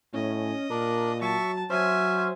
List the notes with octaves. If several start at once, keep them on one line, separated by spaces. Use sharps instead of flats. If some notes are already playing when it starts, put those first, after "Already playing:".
A2 C#4 D#5
A#2 D4 A#4
F#3 E5 A5 C#6
F#3 C#4 C5 E5 G#5